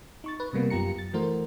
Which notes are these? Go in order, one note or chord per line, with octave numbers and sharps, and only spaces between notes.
D#4 C#6 A6
B4
C3 G3 A#3 B3
F#2 F4 G4 A#5 C#7
A6
E3 A3 F#4 A#4 C5